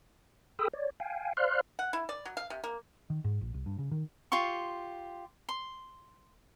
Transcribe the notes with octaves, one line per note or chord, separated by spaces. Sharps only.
G#4 A4 G5 B5 D#6 E6
C#5 D5
F5 G5 G#5
C5 D5 F5 C6 F6 F#6
F#5
E4
D5
F#3
F5
C3
A#3
D#3
G#2
A#1
C2
G2
C#3
D#3
F4 G4 C6 C#6
C6